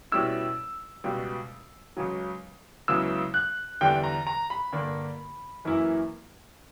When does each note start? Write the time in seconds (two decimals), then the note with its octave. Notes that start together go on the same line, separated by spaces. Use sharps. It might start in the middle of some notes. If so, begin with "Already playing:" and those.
0.12 B2 G3 C#4 E4 E6
1.04 C#2 B2 G3
1.97 C#2 C#3 F#3
2.88 C#2 C#3 F#3 B3 E4 E6
3.34 F#6
3.81 E2 D3 G3 B3 D4 G5
4.03 A#5
4.27 A#5
4.50 B5
4.72 G2 D3 A#3 D4
5.65 F#2 E3 A#3 E4